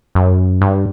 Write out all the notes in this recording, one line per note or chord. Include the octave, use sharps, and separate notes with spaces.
F#2
G2